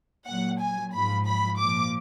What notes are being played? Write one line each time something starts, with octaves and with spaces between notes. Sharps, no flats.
A#2 F#3 F#5
G#5
G#2 F3 B5
B5
A#2 F3 D6